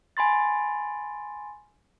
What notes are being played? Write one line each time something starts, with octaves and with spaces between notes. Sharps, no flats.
G#5 B5 C6 A6